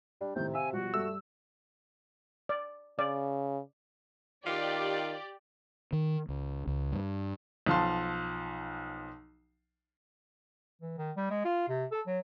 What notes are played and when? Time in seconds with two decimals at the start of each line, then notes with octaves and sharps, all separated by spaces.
0.21 G3 D4
0.36 A2 C3 D#3 G6
0.53 E5 F5 G#5 E6
0.73 B2 F3 G3 F#4
0.94 G2 G3 A3 E6
2.49 D5
2.99 C#3 D5
4.46 D#3 F4 G4 D5
5.93 D#3
6.29 C#2
6.67 C#2
6.93 G2
7.66 B1 F3 A5 C6
10.81 E3
10.97 D#3
11.16 G3
11.30 G#3
11.45 F4
11.68 C3
11.92 A4
12.07 F#3